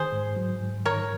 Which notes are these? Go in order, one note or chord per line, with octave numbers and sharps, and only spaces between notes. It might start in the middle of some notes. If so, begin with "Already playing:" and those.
Already playing: D#3 G#4 C5
G#2
F#3
G#2
D#3 A#4 C#5